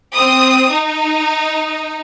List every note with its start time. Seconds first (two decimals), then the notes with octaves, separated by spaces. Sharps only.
0.14 C4 D#6
0.71 D#4